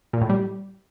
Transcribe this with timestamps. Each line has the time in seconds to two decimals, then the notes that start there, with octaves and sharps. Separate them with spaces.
0.13 A#2
0.21 A2
0.30 G3